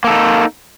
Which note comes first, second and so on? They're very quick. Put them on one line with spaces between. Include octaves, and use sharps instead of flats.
A#3 A4 D#4